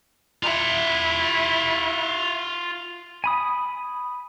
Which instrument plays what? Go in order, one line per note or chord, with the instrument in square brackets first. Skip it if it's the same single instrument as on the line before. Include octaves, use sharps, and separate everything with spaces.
[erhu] E4 [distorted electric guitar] F4 F#5
[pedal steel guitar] G#5 B5 D#6